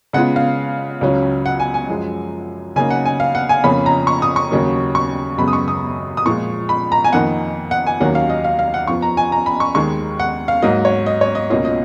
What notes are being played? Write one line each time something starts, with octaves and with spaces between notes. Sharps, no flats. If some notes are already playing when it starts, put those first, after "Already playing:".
C#3 G#3 B3 F4 F#5
F5
C#2 C#3 F#3 C#4
F#5
G#5
G#5
F#2 F3 G#3
C#3 F#3 A#3 D#4 G#5
F#5
G#5
F5
F#5
G#5
F2 C#3 F3 A#3 C#4 B5
A#5
C#6
D#6
C#6
D#2 C#3 F#3 A#3
C#6
F#2 C#3 G#3 B3 B5
D#6
C#6
D#6
D#6
A#2 F3 G#3 C#6
B5
A#5
G#5
F2 D#3 A#3 D#4 F#5
F#5
G#5
D#2 D#3 F#3 A#3 C#4 F#5
F5
D#5
F5
F5
F#5
F2 F3 B3 F4 C#6
A#5
G#5
A#5
B5
C#6
D#2 D#3 G#3 C#6
F#5
F5
G#2 F#3 A#3 D#5
C#5
D#5
C#5
D#5
C#2 B2 A#3 C#4 F4 D#5
D#5